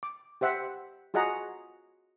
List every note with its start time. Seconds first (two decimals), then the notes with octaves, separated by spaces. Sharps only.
0.03 D6
0.41 G4 C5 E5 F#5 G5
1.14 F4 F#4 G#4 D#5 F#5 A#5